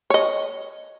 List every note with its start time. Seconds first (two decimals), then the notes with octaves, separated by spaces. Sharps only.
0.10 C#5 D#5